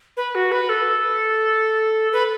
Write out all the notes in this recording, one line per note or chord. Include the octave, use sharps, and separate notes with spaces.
B4
F#4
B4
A4
B4